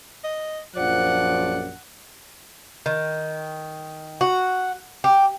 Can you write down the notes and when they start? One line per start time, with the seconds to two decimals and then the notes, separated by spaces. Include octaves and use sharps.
0.24 D#5
0.76 A#1 F#2 F3 D5 F#5
2.86 D#3
4.21 F#4
5.04 G4